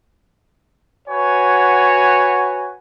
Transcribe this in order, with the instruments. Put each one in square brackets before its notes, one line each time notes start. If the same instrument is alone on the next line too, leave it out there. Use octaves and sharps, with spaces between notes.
[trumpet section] F#4 B4 C#5 F#5 G#5